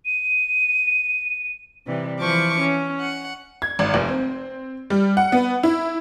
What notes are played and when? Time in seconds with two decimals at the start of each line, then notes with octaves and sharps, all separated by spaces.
0.06 D#7
1.86 C3 E3 G3
2.20 E3 F3 C#6 D6
2.58 C#4
3.00 F#5
3.62 G#6
3.79 G#1
3.94 F1
4.09 C4
4.90 G3
5.17 F#5
5.32 B3
5.63 E4